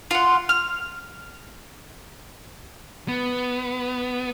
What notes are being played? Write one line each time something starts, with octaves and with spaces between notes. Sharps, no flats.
F4 F#5
F6
B3